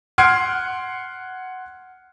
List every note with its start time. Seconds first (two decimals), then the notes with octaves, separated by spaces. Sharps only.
0.18 F#5 C6 F6 G#6 C7 D7